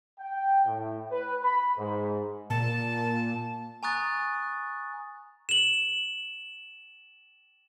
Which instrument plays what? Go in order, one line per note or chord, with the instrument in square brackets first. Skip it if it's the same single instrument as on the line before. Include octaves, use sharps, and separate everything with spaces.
[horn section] G5
A2
B4
B5
G#2
[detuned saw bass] A#2 [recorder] A5
[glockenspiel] G#5 A#5 C#6 D#6 F#6 A6
E7 F#7